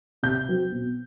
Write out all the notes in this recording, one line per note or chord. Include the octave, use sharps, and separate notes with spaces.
C3 G6
F#3 C4
B2